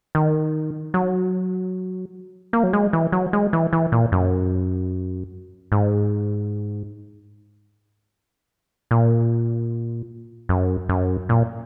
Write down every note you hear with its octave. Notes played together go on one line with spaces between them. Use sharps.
D#3
F#3
A#3
F#3
G#3
E3
F#3
G#3
E3
E3
A#2
F#2
G#2
A#2
F#2
F#2
A#2